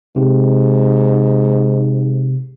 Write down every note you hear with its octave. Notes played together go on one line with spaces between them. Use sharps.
G#2 C3